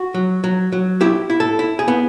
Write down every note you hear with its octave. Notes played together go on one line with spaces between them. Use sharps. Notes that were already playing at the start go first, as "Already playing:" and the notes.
Already playing: F#4
F#3
F#3
F#3
E4 G4
E4
A4
E4
G#4
B3